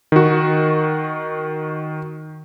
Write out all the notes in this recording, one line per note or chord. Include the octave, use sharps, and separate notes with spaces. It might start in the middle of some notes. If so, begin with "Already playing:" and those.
D#3 F#4